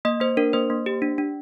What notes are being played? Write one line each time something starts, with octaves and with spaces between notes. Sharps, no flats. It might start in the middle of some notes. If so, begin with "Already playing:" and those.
A#3 D#5
A#3 C5
D4 A#4
A#3 C5
A#3
G4
D4
D4